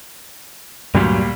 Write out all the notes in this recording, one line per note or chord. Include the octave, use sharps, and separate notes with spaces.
D2 G2 A#2 F#3 G3